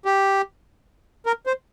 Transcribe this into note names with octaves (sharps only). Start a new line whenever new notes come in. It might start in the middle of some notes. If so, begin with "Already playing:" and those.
G4
A#4
C5